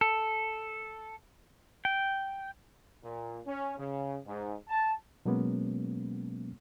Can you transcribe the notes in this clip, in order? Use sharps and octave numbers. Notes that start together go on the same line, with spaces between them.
A4
G5
A#2
C#4
C#3
G#2
A5
B2 F#3 G#3 A#3 B3 C#4